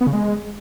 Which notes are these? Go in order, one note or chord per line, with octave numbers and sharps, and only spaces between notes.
B3
C#3
G#3